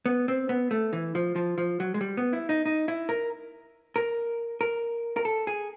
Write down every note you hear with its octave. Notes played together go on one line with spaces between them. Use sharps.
B3
C4
B3
A3
E3
F3
F3
F3
F#3
G#3
G3
B3
E4
D#4
D#4
E4
A#4
A#4
A#4
A#4
A4
G#4